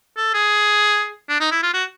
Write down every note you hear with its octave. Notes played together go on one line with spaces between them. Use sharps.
A4
G#4
D4
D#4
E4
F4
F#4